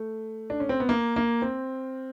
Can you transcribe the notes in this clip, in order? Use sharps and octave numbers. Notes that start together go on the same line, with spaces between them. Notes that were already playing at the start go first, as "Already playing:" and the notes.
Already playing: A3
D4
C#4
C4
B3
A#3
A#3
C4